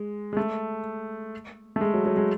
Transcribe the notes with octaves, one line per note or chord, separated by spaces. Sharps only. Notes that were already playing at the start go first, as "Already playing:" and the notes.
Already playing: G#3
G#3
A3
A3
G#3
F#3
F#3
G#3